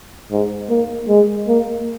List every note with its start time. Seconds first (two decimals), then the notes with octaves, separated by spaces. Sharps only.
0.31 G#2
0.70 A#3
1.09 G#3
1.48 A#3